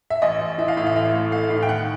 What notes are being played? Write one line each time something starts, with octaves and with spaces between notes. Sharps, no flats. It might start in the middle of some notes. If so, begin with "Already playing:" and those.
E5
A1 D#5
A1
E3 E5
F5
A2 E5
F5
A1 E5
A3
A3 F5
A2
G5
D#3 F#5